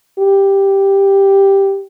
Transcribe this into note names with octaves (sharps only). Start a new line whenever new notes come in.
G4